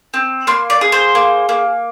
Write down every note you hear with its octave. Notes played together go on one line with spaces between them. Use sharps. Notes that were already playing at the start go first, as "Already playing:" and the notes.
C4
A#3 C6
D5
G#4
C5
A#3
A#3